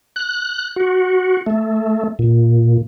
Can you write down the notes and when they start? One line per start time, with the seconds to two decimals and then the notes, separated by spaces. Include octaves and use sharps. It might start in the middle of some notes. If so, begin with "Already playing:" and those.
0.16 F#6
0.76 F#4
1.46 A3
2.19 A#2